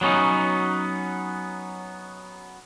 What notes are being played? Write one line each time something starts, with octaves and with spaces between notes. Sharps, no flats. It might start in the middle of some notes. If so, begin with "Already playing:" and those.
F#3 B3 C#4 D#4